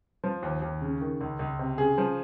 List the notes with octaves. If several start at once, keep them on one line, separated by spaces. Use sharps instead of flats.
F3
D#2
D#2
C#3
D#3
C#2
C#2
C3
C#3 G#4
F3